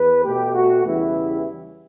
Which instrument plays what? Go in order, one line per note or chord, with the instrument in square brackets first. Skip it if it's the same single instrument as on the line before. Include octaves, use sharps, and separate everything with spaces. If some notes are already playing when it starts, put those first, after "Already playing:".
Already playing: [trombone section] E2 B4
B2 A3 G4
F#4
E2 C#3 E3 G3 B3 E4